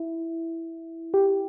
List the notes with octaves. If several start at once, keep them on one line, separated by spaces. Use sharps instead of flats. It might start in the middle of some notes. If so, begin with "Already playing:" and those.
Already playing: E4
G4